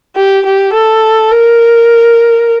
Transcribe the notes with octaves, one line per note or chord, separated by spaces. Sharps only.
G4
G4
A4
A#4